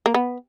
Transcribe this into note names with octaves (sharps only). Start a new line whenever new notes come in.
A#3
B3